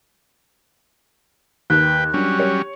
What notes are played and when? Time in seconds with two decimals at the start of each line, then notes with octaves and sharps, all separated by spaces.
1.70 D#2 B4 G5 F#6
2.14 F#3 G3 C#4 D4
2.39 G4 C#5